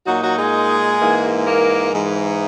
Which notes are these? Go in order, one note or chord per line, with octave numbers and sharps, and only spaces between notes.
A#2 F#3 A#3 D#4 F#4
F#3 F#4
G#3 G#4
G#2 E3 A#3
A#3 A#4
G#2 E3 G#3